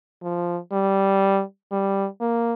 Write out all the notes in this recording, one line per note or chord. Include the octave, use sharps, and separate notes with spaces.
F3
G3
G3
A#3